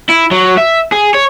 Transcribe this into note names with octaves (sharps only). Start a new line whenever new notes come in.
E4
F#3
E5
G#4
C#5